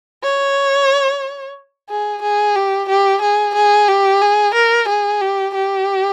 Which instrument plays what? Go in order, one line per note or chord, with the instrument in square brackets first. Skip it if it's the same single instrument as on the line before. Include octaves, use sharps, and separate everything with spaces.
[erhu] C#5
G#4
G#4
G4
G4
G#4
G#4
G4
G#4
A#4
G#4
G4
G4